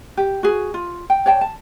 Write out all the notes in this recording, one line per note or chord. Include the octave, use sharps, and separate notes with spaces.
G4
F#4 G#4
F4
G5
C#5 D5 G5 A5
A5